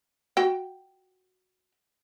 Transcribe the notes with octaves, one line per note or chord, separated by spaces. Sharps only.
F#4 G5